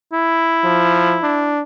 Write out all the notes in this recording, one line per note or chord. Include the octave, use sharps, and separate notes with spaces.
E4
F3
D4